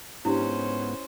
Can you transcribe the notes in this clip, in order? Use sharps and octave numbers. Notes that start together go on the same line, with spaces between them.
G#2 B3 C#4 D4 E4 G4 C5